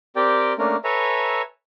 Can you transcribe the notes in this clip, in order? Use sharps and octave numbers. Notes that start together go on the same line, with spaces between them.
C4 G4 A#4 D5 G5
A3 A#3 C#4 D4 A#4
A4 B4 C#5 E5 G#5 A#5